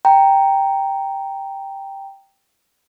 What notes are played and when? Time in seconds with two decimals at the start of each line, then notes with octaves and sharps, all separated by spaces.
0.05 G5 A#5